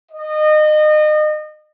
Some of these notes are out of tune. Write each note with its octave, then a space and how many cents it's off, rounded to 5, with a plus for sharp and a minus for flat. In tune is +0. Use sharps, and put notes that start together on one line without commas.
D#5 -30